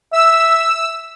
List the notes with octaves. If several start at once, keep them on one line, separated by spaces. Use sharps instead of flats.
E5 E6